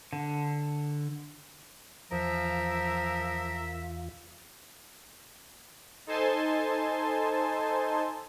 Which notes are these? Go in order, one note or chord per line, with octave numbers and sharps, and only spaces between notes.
D3
E2 F3 F4 A#4 E5
D#4 A4 C5 G#5 A5 C6